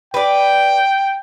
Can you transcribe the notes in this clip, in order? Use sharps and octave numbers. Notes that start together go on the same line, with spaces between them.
B4 D5 G5